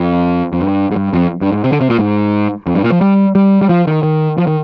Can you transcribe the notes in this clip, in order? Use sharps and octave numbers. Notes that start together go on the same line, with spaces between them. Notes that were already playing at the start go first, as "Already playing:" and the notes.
Already playing: F2
F2
G2
G#2
G2
F2
G2
G#2
C3
D3
C3
A#2
G#2
F2
G2
A#2
F3
G3
G3
G3
F3
D#3
D#3
F3
D#3